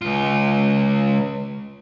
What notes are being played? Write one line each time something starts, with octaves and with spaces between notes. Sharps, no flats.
C#2 F4